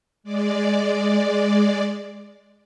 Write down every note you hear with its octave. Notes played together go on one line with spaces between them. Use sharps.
G#3 D5